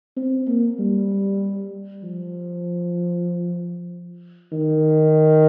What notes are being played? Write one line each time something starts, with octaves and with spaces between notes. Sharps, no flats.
C4
A#3
G3
F3
D#3